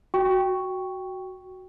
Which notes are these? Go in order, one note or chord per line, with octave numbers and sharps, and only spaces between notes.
F#4 G5 C#6